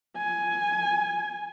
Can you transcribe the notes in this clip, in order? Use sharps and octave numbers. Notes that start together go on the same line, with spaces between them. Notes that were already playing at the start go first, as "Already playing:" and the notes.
G#5